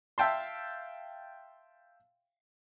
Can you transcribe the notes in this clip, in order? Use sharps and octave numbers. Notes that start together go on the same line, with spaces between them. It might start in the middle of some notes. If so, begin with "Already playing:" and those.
E5 F5 G5 A5 C6